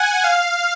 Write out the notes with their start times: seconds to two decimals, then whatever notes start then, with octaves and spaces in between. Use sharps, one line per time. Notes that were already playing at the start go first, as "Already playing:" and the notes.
Already playing: F#5 G#5
0.24 F5